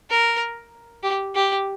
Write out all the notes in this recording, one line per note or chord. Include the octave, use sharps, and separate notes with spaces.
A#4
G4
G4